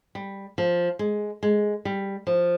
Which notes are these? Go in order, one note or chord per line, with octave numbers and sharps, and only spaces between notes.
G3
F3
G#3
G#3
G3
F3